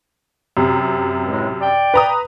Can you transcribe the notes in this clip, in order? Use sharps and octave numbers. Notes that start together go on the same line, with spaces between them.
F#2 C3
C#2 A2 G#3
D5 G5
B4 A#5 D#6